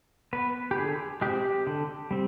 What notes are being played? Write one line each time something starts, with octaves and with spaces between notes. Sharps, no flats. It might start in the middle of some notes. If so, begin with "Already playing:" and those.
B3 B4
G4
D3 G#4
G#3 C4 G4
D3
G3 C4